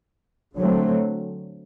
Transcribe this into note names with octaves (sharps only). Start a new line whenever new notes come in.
D3 F#3 A3 C4